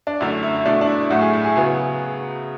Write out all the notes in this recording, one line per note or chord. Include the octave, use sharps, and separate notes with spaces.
D4
F#2 D3 A3 E4
E4
B2 A3 D4
D4
E4
A2 F#3 A3 F#4
G#4
E4
G#4
C#3 F#3 B3 G#4